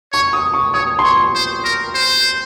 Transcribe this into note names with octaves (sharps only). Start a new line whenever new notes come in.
C#5 C#6
D#6
C#6
C#5 D#6
C6
C#5 C#6
C5
A#4
C5